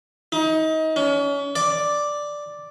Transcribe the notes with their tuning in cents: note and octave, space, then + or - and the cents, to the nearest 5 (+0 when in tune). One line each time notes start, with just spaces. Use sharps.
D#4 +30
C#4 +35
D5 +0